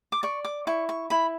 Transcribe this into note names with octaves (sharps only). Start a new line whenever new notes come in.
D6
D5 C#6
D6
E4 C#6
C#6
E4 B5